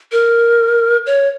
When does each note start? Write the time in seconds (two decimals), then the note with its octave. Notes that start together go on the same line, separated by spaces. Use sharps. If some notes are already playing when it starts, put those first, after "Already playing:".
0.12 A#4
1.06 C#5